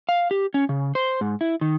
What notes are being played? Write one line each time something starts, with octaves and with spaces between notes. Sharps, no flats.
F5
G4
C#4
C#3
C5
G#2
E4
D#3